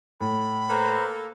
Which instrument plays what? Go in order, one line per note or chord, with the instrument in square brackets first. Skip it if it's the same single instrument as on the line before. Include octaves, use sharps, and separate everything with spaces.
[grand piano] A2 [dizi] B5
[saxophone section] A#3 A4 [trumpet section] B4 C5 A#5